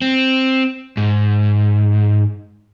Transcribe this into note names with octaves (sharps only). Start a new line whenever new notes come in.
C4
G#2